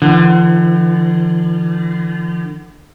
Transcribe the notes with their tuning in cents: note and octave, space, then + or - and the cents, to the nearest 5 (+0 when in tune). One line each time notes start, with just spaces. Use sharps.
D3 +35 F3 -40